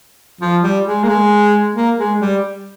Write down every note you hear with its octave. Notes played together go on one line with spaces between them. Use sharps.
F3
G3
G#3
A#3
G#3
A#3
G#3
G3